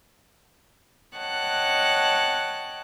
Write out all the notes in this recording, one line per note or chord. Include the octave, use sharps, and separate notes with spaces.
C#5 D#5 F#5 G5 A5 F#6